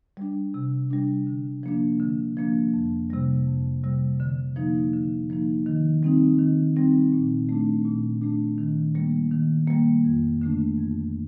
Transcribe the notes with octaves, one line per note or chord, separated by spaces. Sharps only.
G3 D4
C3
G3 D4
D3
F3 A#3 D4
D3
F3 A#3 D4
F2
C3 G3
F2
C3 G3
D3
F3 A#3 D#4
D3
F3 A#3 D#4
D#3
G3 C4 D#4
D#3
G3 C4 D#4
A#2
A3 D4
A#2
A3 D4
D#3
G3 A#3
D#3
G3 A#3
F2
D3 A3 D4
F2